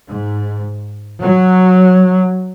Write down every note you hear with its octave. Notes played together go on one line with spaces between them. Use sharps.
G#2
F#3